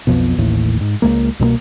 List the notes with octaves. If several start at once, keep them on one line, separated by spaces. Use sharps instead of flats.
B1 F2 B2
A1 D#2 A2
G#2
C#2 G2 G#3 A#3
C2 B2 F#3 A#3